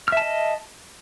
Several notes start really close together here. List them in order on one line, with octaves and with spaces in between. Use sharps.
F6 E5 A5 D#5